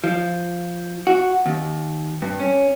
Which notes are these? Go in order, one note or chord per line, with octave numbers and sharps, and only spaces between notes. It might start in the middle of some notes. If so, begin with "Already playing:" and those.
F3
F#4
D#2
G2
C#4